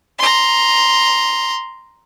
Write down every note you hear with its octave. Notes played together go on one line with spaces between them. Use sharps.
A#5 C6